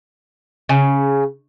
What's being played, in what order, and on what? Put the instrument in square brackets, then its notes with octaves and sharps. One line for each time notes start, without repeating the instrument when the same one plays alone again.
[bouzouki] C#3